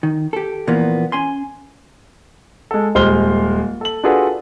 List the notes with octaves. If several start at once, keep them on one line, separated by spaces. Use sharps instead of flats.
D#3
G4 A4
A#2 E3 F3 A#3 B3
C#4 G#5 C6
G#3 A4
D#1 G#3 C5 C6 F6 G7
A4 F#7
D4 F4 F#4 G#4 A4 B4